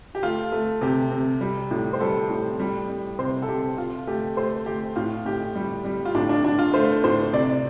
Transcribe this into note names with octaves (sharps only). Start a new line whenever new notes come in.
G4
A3 F4
A3
C3 G4
C3
G3
A2
C5
G3 A4
A2
G3
G3
C3 C5
A4
C3 G4
C3 F4
A3 G4
A3 C5
A3 G4
A2 F4
A2 G4
G3
G3
F4
A2 D4
D4
A2 D4
F4
A3 C5
A2 C5
C3 D5